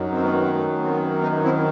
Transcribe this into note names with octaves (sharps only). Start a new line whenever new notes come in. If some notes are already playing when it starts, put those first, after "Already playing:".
Already playing: F#2 D#3 F#3
C4
B3
A3
C4
B3
B3 D#4
C4 E4